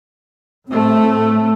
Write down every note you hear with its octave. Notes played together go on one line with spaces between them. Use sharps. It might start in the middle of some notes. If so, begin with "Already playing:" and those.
A2 A3 C4